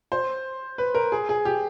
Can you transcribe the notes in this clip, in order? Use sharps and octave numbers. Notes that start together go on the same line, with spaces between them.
C5
B4
A#4
G#4
G#4
G4